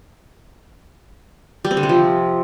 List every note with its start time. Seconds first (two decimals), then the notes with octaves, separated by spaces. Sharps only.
1.65 G3
1.71 C4
1.77 D3
1.83 C3
1.89 F3